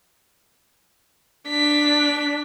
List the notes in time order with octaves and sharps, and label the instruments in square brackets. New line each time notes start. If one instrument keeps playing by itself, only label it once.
[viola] D4 [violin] B6